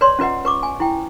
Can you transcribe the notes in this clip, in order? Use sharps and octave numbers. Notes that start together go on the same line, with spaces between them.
B4 C#5 D5 C6
C#4 F4 B4 D#5 F#5
B4 C#6 D6
G#5
E4 G5